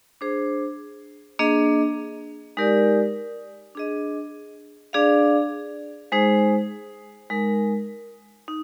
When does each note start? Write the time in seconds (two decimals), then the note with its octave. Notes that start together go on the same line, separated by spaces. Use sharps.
0.21 D4 G#4 C5
1.39 A#3 D4 G#4 D#5
2.57 G#3 D#4 G4 A#4 D5
3.75 D4 G#4 D#5
4.93 D4 G#4 D5 F5
6.12 G#3 D#4 G#4 C5
7.30 G#3 D#4 A#4
8.48 D#4